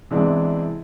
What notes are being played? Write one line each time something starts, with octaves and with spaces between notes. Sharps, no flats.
C3 E3 G#3 B3 D4